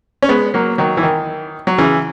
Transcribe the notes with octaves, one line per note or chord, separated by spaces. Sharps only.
C#4
G#3 B3
F#3 A#3
D#3 F#3
E3
D#3
F#3
C#3 E3